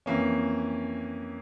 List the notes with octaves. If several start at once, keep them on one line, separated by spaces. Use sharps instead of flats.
F2 E3 A#3 C#4